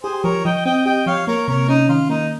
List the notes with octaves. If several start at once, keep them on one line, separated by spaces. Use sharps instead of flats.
G4 G#4 C5
F3 A#4 C#5
F3 D#5 G5
C4 D#5 G5
G4 D#5 G5
F3 C#5 F5
A#3 A#4 C#5
C3 A#4 C#5
C#4 D#4
D#3 F4
A#3 D#4